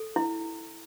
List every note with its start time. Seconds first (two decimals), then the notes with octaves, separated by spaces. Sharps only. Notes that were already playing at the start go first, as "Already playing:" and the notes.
Already playing: A4
0.16 E4